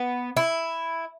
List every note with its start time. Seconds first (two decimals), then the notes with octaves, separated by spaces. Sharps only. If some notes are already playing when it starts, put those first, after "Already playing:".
Already playing: B3
0.37 E4